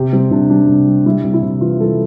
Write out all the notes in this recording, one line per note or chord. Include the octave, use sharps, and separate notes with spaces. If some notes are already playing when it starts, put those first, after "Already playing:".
Already playing: C3 G4
G3 C4
C3 D4
G3 D4
C3
G3
G3 E4
C3
E4
C3
E3 F4
G3 A4